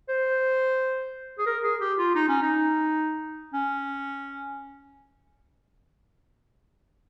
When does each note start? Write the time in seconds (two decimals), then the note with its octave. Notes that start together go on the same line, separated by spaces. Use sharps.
0.09 C5
1.39 G#4
1.46 A#4
1.63 G#4
1.81 G4
1.98 F4
2.15 D#4
2.28 C#4
2.42 D#4
3.53 C#4